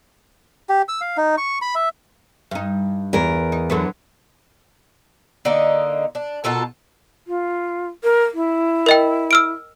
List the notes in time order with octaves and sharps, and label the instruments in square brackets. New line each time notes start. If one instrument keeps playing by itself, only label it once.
[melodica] G4
E6
F5
D#4
C#6
B5
E5
[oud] G2 D#4
[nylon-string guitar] E2 A#4
[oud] D#4
D3 F#3 B3
[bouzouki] D3 A#3 D#4
D4
B2 F4 A4 A#4
[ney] F4
A#4
E4
[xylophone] A#4 D#5 G5
E6 F6 D7